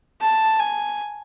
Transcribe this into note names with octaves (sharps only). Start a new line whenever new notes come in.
A5
G#5